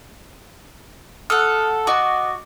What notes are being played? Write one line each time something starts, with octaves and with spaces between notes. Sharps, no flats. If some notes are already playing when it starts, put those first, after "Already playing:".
A4 F#5 D#6 F6
F#4 D#5 D6 D#6